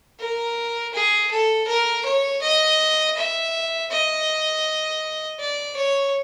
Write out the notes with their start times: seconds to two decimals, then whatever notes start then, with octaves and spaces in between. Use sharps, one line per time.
0.20 A#4
0.94 G#4
1.31 A4
1.68 A#4
2.06 C#5
2.42 D#5
3.17 E5
3.91 D#5
5.40 D5
5.77 C#5